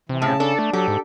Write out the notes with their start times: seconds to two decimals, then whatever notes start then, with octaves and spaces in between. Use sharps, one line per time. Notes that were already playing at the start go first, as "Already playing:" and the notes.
0.09 C3 E3
0.22 A2 C#3 A5
0.40 D4 A4
0.59 A3
0.73 F#3 G4 A4
0.88 G#2